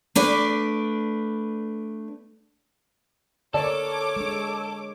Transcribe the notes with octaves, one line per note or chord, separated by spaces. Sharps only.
A3 D4 B4 D5
D3 A4 A#4 C#5 D5 D6
G#3 D4